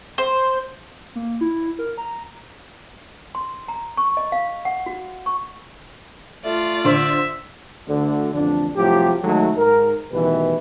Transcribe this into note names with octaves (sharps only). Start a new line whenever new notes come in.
C5
A#3
E4
A#4
A#5
C6
A#5
C#6
D#5
F5
F#5
F#4
C#6
A3 F4 D5
D3 C5 E5
D2 D3
A1 F2 D3 D4
C2 A2 F3 F#3 G4
D#3 F#3 G#3 A3 D#4 A4
G#2 A#4
A1 B2 D#3 E3 G3 B4